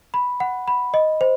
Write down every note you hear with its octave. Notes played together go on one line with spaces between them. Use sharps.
B5
F#5
B5
D#5
C5